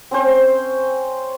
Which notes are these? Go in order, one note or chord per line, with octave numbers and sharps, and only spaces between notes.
C4 C#4 C5